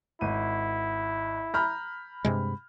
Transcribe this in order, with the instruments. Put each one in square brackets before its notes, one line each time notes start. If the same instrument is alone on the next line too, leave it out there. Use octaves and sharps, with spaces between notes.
[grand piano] G#1 D#7 [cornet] E4
[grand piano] A#5 [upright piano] B5 F6 G6
[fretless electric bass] G2 C3 G#3